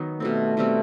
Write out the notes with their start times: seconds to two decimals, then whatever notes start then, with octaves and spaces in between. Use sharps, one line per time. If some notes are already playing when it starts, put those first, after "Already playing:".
Already playing: D#3 F#3 B3 D#4
0.20 B2 G3 A3 C4
0.57 B2 G3 C4